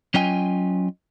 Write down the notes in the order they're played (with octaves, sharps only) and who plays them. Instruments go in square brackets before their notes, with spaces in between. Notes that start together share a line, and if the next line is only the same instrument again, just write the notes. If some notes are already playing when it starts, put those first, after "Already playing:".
[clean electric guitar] F#3 C#4 F4 D#5 G5 G#5